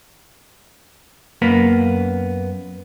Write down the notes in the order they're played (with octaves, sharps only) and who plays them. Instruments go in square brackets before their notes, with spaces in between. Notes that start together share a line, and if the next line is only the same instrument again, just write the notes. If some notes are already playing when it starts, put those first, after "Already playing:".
[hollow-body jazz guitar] F#2 A#3 B3 B5